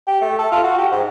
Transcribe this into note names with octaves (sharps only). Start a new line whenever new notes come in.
G4
A3
A4
F4
F#4
G4
G#2